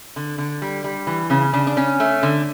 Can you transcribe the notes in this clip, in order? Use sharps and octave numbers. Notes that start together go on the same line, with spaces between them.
D3
D3
G3
G3
E3
C#3 C#4
C#3 D4
D4
C#3 C#4
A3
D3